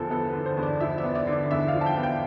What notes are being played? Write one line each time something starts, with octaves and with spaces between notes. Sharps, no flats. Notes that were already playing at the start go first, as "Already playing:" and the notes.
Already playing: E2 D3 F3 A4
B3 A4
D3 B4
C5
E2
D5
F3 E5
E5
B3
D5
D3
D5
E2 E5
F5
F3
A5
G5
B3
G5